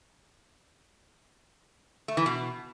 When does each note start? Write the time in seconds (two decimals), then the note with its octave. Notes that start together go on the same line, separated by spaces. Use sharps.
2.08 A3
2.17 E3
2.26 B2